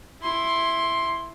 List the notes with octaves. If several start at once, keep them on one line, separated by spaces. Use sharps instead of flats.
E4 C6